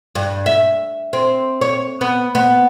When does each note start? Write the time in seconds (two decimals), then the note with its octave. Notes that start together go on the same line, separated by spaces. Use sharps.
0.15 G2
0.46 E5
1.13 C4
1.61 C#5
2.01 B3
2.35 B3